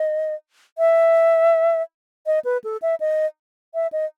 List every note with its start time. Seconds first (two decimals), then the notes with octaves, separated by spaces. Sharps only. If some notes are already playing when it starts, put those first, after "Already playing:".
Already playing: D#5
0.78 E5
2.26 D#5
2.44 B4
2.64 A4
2.82 E5
3.00 D#5
3.74 E5
3.92 D#5